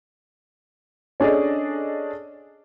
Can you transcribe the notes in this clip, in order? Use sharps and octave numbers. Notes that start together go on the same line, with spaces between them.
C#4 D4 G#4 A4 D5 D#5